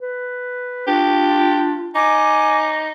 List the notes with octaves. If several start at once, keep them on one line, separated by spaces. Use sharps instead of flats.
B4
D4 F4 G4
D#4 G#5 D6